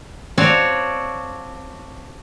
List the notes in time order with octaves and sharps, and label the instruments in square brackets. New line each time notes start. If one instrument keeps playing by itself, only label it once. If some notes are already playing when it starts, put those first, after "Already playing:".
[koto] C4 D4 F#4 C#5 F5